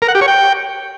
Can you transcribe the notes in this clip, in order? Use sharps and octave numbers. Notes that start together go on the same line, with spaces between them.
A#4
F#5
G4
C#5
G5